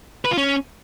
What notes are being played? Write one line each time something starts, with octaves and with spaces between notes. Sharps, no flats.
B4
F4
C#4